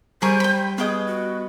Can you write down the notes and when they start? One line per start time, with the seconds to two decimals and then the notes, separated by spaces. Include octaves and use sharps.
0.22 G3 G#4 A#4 C5 C#5 B6 D#7
0.40 G5 B5
0.78 B3 G#4 B4 D#5 G5 D#6
1.07 F#4